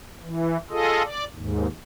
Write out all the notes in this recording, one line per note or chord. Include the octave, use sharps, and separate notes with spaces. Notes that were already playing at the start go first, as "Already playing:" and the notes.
E3
F4 G#4 A4 D#5
D5
D#2 G#2